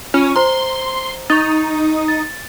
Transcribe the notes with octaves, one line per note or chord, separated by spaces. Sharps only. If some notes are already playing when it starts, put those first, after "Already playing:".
C#4 F4
C5 A#5 C6
D#4 C#6 A6
A6